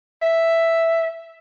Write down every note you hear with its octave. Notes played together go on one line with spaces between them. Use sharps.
E5